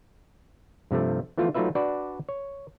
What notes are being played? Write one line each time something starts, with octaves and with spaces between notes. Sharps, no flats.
G2 C3 F3 A3
E3 F3 A3 B3 F4
F#3 A3 D#4 F4 B4 E5
D4 F#4 B4 D5
C#5